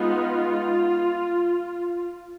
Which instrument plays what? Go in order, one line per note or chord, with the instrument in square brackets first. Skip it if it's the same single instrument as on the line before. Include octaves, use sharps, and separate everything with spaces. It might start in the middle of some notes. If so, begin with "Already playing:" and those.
Already playing: [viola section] G#3 B3 D#4 F4